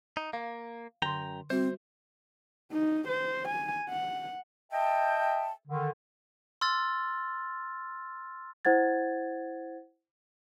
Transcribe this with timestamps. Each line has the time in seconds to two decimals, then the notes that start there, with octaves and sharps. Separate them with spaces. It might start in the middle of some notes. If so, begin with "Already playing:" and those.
0.17 D#4
0.33 A#3 F5
1.02 F#2 D3 G5 A#5 C6
1.50 G3 C4 F#4 C5
2.72 D#4
3.08 C5
3.48 G#5
3.89 F#5
4.72 D#5 E5 G5 A5
5.68 D3 D#3
6.61 C6 E6 F6 A6
8.65 E4 C5 F#5 G#6 A6